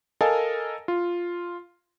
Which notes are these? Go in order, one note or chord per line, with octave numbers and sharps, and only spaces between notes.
A4 A#4 D#5 F5 G#5 A5
F4